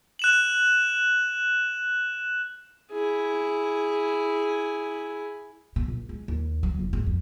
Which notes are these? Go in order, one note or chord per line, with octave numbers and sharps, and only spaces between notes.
F#6 E7 F#7
E4 G#4
B2
A#1
G#3
D#2
F#3
F1
G#2
F2